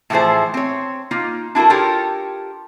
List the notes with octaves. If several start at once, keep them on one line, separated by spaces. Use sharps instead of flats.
A2 E3 F3 A3 G#4 C5
C4 C#5
A#3 D#4 F4
D4 E4 F#4 A4 A#4
F4 G4 A4 A#4 C#5